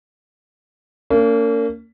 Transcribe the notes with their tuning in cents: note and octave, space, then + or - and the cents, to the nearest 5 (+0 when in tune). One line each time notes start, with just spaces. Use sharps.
A#3 -30 C#4 +40